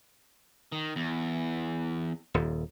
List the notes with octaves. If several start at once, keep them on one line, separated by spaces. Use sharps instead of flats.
D#3
E2
D#1 D#2